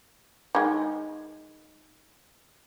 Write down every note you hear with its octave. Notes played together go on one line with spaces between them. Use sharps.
D#3 G#3